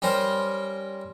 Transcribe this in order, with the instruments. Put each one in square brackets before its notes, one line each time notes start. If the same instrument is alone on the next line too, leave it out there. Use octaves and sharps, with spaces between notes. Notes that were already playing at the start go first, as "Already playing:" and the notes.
[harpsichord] G3 C#4 A#4 C5